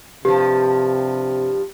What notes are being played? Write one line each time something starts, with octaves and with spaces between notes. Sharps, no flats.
G2 C3 F3 G4